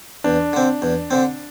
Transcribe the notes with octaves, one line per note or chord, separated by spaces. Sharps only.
E2 D4
D3 C4
E2
D3 C4